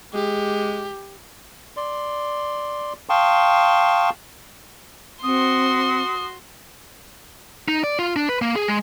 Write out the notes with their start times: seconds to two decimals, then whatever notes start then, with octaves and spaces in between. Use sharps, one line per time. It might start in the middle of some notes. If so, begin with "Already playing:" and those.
0.14 G#3 G4
1.77 D5 C6
3.09 F5 G5 A5 C6 C#6 D#6
5.23 C4 F#4 C6 D#6
7.68 D#4
7.84 D5
7.99 F4
8.16 D4
8.29 B4
8.42 A#3
8.56 G#4
8.68 G#3